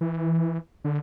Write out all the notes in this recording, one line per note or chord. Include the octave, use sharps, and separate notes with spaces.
E3
D3